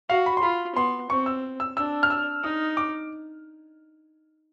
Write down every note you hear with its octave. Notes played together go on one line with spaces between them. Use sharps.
F#4 F5
B5
C6
F4 B5
B3 C6
C4 C#6
E6
E6
D4 E6
F6
E6
D#4 D#6
D6